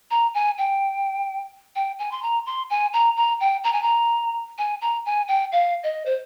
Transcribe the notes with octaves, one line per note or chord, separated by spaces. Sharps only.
A#5
G#5
G5
G5
G#5
C6
A#5
C6
G#5
A#5
A#5
G5
A#5
G#5
A#5
G#5
A#5
G#5
G5
F5
D#5
C5